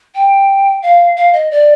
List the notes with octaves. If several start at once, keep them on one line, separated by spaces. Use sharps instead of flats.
G5
F5
F5
D#5
D5